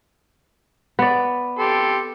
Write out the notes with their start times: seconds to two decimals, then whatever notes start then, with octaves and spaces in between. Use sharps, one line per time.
0.99 B3 D5
1.59 G4 A4 C6